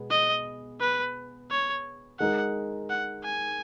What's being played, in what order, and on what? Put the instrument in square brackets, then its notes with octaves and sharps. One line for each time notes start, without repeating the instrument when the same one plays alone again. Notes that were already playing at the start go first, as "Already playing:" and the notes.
Already playing: [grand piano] B2 G#3 B3 G#4
[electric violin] D#5
B4
C#5
[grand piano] G#3 D#4 A#4 [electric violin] F#5
[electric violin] F#5
G#5